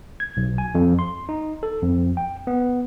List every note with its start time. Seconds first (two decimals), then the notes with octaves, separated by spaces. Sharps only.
0.20 G#6
0.37 B1
0.58 G#5
0.75 F2
0.99 C6
1.29 D#4
1.63 A4
1.82 F2
2.17 G5
2.47 B3